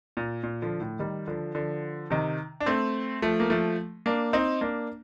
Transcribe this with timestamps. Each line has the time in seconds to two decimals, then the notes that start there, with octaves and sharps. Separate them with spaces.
0.17 A#2
0.43 A#2
0.62 D3 F3
0.81 A2
0.99 D#3 G3
1.28 D3 F3
1.55 D3 F3
2.10 C3 D#3
2.60 D4
2.66 A3 C4
3.22 F3 A3
3.40 A#3
3.50 F3 A3
4.06 A#3 D4
4.33 C4 D#4
4.61 A#3 D4